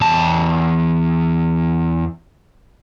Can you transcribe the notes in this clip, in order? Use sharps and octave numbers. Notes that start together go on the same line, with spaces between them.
E2 A5